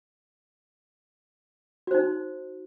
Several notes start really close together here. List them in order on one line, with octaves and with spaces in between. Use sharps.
F#4 C5 D#4